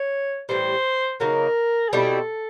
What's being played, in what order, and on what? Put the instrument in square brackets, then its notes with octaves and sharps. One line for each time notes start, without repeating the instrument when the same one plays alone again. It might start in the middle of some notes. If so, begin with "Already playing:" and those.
Already playing: [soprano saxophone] C#5
[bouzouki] A2 E3 G3 [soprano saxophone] C5
[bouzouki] C#3 F#3 A#3 D#4 [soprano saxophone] A#4
[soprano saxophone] G#4
[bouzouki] B2 G3 C4 E4 [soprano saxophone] A4